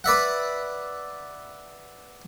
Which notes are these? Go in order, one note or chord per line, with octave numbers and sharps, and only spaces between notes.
B4 D5 E5 F#5